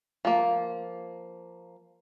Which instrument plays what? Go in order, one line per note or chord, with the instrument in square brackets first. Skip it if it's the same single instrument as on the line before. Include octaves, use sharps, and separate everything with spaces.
[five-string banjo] F3 A#3